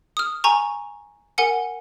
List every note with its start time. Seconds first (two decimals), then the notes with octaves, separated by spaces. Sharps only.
0.17 D#6 F6
0.44 G#5 A#5 C#6
1.38 A#4 F#5 G#5 C#7